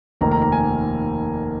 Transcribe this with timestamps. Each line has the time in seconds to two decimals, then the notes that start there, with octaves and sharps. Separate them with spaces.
0.21 F1 D#2 D#3 A#3 A#5
0.31 A#5
0.42 A#5
0.52 G#5